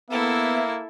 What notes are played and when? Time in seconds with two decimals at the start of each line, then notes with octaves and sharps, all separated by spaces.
0.10 A#3 B3 E4 A4 E5